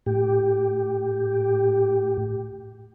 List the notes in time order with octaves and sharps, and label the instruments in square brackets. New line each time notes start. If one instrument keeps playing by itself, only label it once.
[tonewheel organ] A2 G4